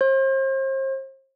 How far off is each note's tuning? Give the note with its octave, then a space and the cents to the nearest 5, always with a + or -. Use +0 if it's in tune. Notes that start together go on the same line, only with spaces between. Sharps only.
C5 +40